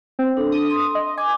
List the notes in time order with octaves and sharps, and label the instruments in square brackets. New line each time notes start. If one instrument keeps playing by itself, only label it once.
[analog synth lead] C4
[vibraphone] D4 A4
[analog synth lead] D#6
[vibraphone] C6
[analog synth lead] D#5
[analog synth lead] G#5 [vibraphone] D6